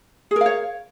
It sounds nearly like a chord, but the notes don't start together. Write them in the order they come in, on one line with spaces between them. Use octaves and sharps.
G#4 A#4 F5 C#5